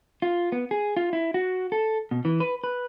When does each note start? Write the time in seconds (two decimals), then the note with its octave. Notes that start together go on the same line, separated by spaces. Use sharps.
0.22 F4
0.52 B3
0.71 G#4
0.97 F4
1.13 E4
1.34 F#4
1.72 A4
2.11 B2
2.25 E3
2.40 B4
2.64 B4